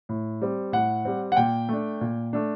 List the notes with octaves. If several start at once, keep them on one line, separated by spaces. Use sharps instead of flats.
A2
G3 C4
A2 F#5
G3 C4
F#5
A#2 G5
A3 D4
A#2
A3 D4